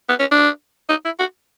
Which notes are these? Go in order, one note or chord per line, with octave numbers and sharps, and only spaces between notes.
B3
C#4
D4
D#4
E4
F#4